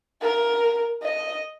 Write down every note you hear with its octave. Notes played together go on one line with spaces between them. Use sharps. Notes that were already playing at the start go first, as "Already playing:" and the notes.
A#4
D#5